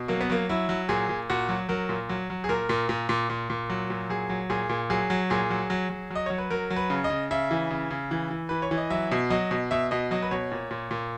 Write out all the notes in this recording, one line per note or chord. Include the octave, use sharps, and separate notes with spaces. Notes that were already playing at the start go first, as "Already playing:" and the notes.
Already playing: B2
F#3 A#3
B3
F#3 A#3
F#3 E4
F#3
A#2 G#4
A#2
A#2 F#4
F#3
F#3 A#4
A#2
F#3
F#3
G#4
A#2 A#4
A#2
A#2
A#2
A#2
A#2
F#3
A#2
F#3 G#4
F#3
A#2 G#4
A#2
F#3 G#4
F#3
A#2 G#4
F#3
F#3
F#3
F#3 D#5
F#3 C#5
B4
F#3 A#4
F#3
B4
C#3
D#5
C#3
C#3 E5
E3
C#3
C#3
E3
E3
E3 B4
C#5
E3
D#5
F#3 E5
B2
F#3 D#5
B2
B2 E5
B2 D#5
F#3 D#5
B4
B2 C#5
A#2
A#2
A#2